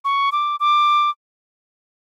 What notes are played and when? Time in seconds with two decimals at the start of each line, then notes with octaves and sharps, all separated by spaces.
0.05 C#6
0.32 D6
0.60 D6